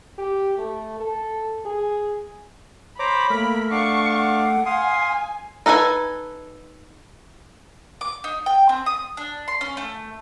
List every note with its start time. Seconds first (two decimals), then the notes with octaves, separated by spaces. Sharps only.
0.18 G4
0.58 A3
1.00 A4
1.66 G#4
2.99 C5 C#5 A#5 B5 D6
3.30 A3 A#3 A#4
3.71 D4 F5 F#5 C#6 D6
4.16 F#5
4.66 F5 G#5 C6 D#6
5.66 D#4 A4 B4 C5 G#5
8.01 D6
8.24 D#4
8.46 G5
8.69 C4
8.86 D#6
9.17 D4
9.48 C6
9.61 C#4
9.77 A3